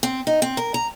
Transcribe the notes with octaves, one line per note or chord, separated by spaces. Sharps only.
C4
D#4
C4
A#4
A#5